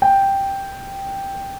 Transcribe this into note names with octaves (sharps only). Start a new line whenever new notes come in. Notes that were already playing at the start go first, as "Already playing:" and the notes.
G5